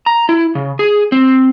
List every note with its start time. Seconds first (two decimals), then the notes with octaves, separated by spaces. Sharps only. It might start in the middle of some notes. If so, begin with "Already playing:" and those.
0.06 A#5
0.29 E4
0.55 C#3
0.79 G#4
1.12 C4